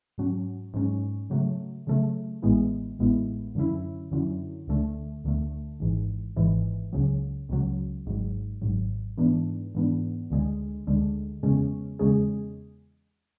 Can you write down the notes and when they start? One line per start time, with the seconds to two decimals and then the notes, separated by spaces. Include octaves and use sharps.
0.18 G#2 F#3 C#4
0.74 G#2 F#3 C#4
1.30 C#3 F#3 A3
1.87 C#3 F#3 A3
2.42 A1 A2 G#3 B3 E4
2.99 A1 A2 G#3 B3 E4
3.55 F#2 D3 F#3 C#4 E4
4.11 F#2 D3 F#3 C#4 E4
4.67 D2 D3 A3
5.24 D2 D3 A3
5.80 G#1 G#2 E3
6.36 G#1 G#2 E3
6.93 C#2 C#3 F#3
7.49 C#2 C#3 F#3
8.06 G#1 G#2 F#3
8.61 G#1 G#2 F#3
9.18 G#2 E3 B3 D4
9.75 G#2 E3 B3 D4
10.30 D2 D3 G#3
10.87 D2 D3 G#3
11.43 E2 C#3 G#3 C#4 G#4
11.99 E2 C#3 G#3 C#4 G#4